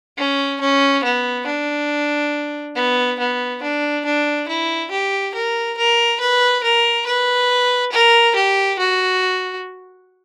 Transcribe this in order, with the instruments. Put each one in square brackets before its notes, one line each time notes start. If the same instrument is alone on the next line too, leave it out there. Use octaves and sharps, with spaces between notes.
[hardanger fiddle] C#4
C#4
B3
D4
B3
B3
D4
D4
E4
G4
A#4
A#4
B4
A#4
B4
A#4
G4
F#4